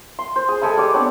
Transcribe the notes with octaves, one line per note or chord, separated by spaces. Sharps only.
C6
C5
G#4
G#3 A4 G#5 B5
G3 B4 D6 E6
B3 C4 D4 C#5